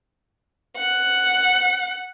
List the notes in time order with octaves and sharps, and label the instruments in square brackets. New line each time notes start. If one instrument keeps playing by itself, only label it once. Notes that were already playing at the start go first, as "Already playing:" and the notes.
[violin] F#5